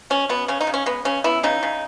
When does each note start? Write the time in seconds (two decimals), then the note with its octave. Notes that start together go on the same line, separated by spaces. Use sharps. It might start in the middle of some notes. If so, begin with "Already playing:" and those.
0.10 B2 C#4
0.29 B2 B3
0.48 C#3 C#4
0.61 D#4
0.67 C#3
0.74 C#4
0.86 G#3 B3
1.05 C#3 C#4
1.24 B3 E4
1.43 C#3 D#4
1.63 C#3